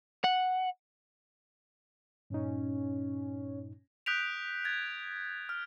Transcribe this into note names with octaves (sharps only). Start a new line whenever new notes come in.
F#5
G2 A#2 C#4 D#4
D#6 F#6 G6 B6 D7 F7
G#6 A6
F6